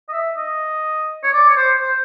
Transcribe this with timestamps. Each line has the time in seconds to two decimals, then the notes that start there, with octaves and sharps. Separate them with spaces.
0.08 D#5
0.13 E5
0.37 D#5
1.24 C#5
1.33 D5
1.49 C#5
1.57 C5
1.82 C5